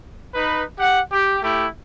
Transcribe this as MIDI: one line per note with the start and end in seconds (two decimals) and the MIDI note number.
0.35 0.62 63
0.35 0.62 71
0.78 1.00 67
0.78 1.00 78
1.11 1.38 67
1.43 1.67 57
1.43 1.67 64
1.43 1.67 67